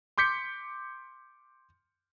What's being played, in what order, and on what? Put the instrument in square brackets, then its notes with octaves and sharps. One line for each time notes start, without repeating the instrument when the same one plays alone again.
[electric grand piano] C6 D6 G6 B6 C#7